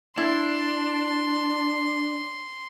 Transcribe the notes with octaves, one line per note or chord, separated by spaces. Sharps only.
D4 E4 C6